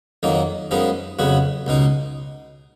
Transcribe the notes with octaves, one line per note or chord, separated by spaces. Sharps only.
F2 D#3 F#3 A#3 D#4
F#2 F3 G#3 B3 D#4
F2 C#3 F#3 B3 F#4
C#2 B2 G#3 D#4